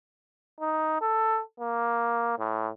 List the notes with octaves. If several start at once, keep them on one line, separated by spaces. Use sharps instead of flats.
D#4
A4
A#3
A2